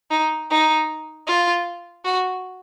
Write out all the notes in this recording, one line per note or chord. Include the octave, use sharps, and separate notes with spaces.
D#4
D#4
F4
F#4